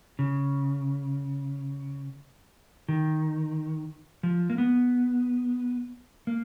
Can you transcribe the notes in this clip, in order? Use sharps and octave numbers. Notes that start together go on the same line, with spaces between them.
C#3
D#3
F3
A#3
B3
A#3